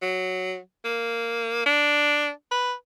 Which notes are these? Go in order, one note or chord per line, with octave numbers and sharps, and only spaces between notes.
F#3
A#3
D4
B4